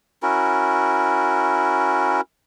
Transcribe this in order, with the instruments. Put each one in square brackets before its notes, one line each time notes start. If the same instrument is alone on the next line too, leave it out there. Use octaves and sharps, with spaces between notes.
[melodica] C#4 E4 F#4 A#4